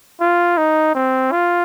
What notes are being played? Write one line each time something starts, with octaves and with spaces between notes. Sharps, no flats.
F4
D#4
C4
F4